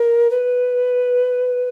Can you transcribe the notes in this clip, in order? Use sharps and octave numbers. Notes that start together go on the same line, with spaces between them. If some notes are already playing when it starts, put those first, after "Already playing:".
Already playing: A#4
B4